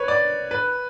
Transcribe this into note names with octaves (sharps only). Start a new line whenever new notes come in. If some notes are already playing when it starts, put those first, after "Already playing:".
Already playing: B4 C#5
D5
B4